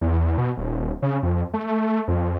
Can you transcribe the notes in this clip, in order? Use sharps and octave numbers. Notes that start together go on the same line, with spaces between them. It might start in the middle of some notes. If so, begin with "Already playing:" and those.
E2
B2
D#1
C#3
F2
A3
F2